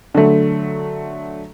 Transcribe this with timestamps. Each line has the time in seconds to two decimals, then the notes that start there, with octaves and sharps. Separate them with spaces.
0.14 D3 F#3 A3